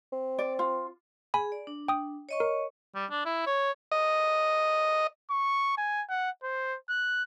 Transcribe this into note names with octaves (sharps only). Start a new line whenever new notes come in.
C4
D5
F4
G#4 G#5 B5
D5
D4
G5 D#6
C#5 D#5 C#6
A#4
G3
D4
E4
C#5
D#5
C#6
G#5
F#5
C5
F#6